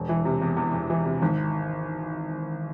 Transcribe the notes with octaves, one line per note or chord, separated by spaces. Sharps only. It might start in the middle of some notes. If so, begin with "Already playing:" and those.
Already playing: E1
E3
C3
E2
E2
E2
E3
C3
G#1